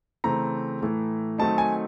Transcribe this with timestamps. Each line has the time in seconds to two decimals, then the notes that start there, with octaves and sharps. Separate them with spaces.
0.24 C#3 E3 A3 C4 A#5
0.81 A2 E3 A3
1.38 D#3 F#3 A3 C4 D#4 A5
1.58 G#5